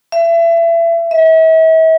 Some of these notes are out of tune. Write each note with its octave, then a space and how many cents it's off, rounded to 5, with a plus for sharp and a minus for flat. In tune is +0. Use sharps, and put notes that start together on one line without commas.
E5 +30
E5 -40